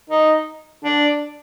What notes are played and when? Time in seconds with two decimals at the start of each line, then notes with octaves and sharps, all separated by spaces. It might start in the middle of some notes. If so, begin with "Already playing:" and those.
0.10 D#4
0.85 D4